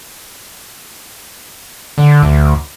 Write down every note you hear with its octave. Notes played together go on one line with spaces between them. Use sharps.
D3
D2